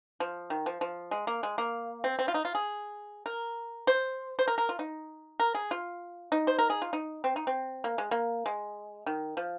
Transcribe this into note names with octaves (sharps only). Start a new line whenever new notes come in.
F3
D#3
F3
F3
G#3
A#3
G#3
A#3
C4
C4
F4
D#4
F4
G#4
A#4
C5
C5
A#4
A#4
F4
D#4
A#4
G#4
F4
D#4
C5
A#4
G#4
F4
D#4
C4
D#4
C4
A#3
G#3
A#3
G#3
D#3
F3